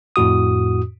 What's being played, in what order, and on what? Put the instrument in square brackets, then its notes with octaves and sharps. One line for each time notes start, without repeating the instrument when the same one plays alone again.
[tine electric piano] F2 A2 F#4 D#6